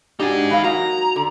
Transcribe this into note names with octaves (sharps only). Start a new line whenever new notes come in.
D4 D#4 F#4 G4 G#5
E3 F5
F#3 A#3 D#4 F#4 A#5
D3